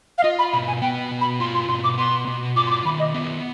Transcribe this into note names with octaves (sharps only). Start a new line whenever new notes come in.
F5
F4 D#5
B5
B2 B5
G#5
B3 G5
B2
B5
F4 C6
C6
B2 C6
D6
B3 C6
B2
F4 D6
C6
D6
D#3 B5
D#5
B3